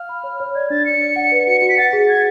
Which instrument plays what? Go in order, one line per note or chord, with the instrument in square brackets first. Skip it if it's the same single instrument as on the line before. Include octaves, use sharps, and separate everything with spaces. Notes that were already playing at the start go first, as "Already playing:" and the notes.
Already playing: [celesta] F5 [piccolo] F6
[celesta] B5
C#5
C#5
[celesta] D5 [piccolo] G#6
[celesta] D4 [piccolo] A6
[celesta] D5 [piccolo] C#7
[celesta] D5
F#5
B4
[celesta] F#4 [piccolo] C#7
[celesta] F#4 [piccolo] C#7
[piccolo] B6
[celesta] F#5 [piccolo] A6
[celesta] G#4
[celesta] G#4 [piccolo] G#6